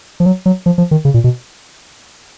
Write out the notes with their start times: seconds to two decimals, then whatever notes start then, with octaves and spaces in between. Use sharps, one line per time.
0.20 F3
0.26 F#3
0.46 F#3
0.66 F3
0.78 F3
0.91 D#3
1.05 C#3
1.14 A#2
1.24 B2